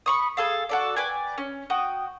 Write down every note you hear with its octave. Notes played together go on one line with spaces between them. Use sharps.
B5 C#6 D#6
G#4 A4 F5
F#4 A4 D5
B4 D5 G5 G#5
C#4
F#4 G5 D#6